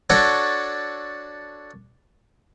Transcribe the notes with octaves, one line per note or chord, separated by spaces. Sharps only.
D4 F#4 A4 C#5